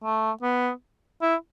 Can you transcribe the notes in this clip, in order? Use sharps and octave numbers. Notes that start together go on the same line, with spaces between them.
A3
B3
E4